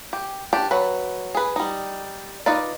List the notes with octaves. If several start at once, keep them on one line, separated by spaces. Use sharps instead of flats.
G4
D4 G4
F#3 B4
G#4 B4
G3 D#4
D#4 F4 B4 D5